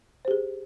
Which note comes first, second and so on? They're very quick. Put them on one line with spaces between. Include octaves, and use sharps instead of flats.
C5 G4 G#4